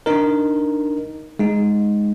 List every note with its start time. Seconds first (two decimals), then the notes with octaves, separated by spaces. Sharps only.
0.06 D4 D#4 A#4
1.39 G#3 D#4